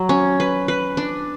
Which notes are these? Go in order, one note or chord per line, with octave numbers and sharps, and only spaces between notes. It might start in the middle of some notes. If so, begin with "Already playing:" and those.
Already playing: F#3
C#4
B4
B4
D4